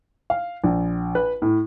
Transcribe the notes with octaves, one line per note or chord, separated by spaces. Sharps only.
F5
A#1
B4
A2